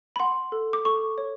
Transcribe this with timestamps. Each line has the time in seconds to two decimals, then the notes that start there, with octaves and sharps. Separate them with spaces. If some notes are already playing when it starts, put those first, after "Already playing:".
0.16 B5
0.19 F#5 C6
0.52 A4
0.73 D6
0.85 A4 C#6
1.18 C#5